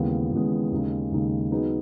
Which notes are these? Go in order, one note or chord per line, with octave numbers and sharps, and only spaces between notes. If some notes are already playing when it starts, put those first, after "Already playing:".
Already playing: D#2 C#3 E3 G#3 B3
D#2 C#3 E3 G#3 B3
D#2 C#3 G#3 D#4
D#2 C#3 G#3 D#4
F#3 B3 D#4 G#4 B4